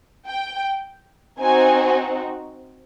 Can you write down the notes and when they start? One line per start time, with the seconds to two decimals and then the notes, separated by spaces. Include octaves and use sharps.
0.26 G5
1.39 C4 D#4 F#4 G#5